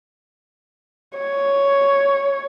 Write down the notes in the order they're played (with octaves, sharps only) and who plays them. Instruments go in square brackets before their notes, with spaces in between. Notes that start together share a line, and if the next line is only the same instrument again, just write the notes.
[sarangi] C#5